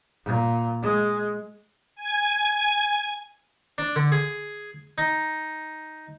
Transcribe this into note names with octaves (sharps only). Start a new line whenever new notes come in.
A#2
G#3
G#5 G#6
D4
D3
G#4
D#4